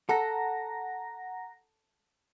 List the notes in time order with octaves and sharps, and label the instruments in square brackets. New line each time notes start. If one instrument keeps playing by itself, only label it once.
[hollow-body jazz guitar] A4 [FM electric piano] F#5 A#5 A#6